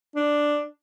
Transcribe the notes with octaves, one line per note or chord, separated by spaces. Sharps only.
D4